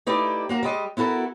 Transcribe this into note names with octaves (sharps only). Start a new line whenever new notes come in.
A3 D#4 E4 G4 B4 D5
A#3 F#4 A#4
G3 G#3 D#5
B3 E4 F#4 A4 A#4